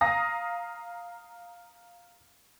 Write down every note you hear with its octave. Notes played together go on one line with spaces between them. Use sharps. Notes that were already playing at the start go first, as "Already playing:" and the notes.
F5 A#5 D#6 A#6